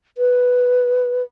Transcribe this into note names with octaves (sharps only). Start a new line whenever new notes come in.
B4